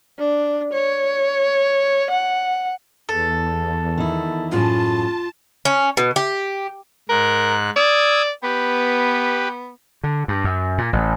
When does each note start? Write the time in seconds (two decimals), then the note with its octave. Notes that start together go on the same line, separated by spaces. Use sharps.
0.18 D4
0.73 C#5
2.10 F#5
3.09 E2 A4
3.98 D#3 E4
4.52 F#2 A2 F4 G#4 A5
5.65 C#4
5.97 B2
6.16 G4
7.09 G#2 A#4 F#6
7.76 D5 D#6 E6 G#6
8.43 B3 G4 B4
10.04 D3
10.28 G2
10.44 F#2
10.78 A#2
10.93 A1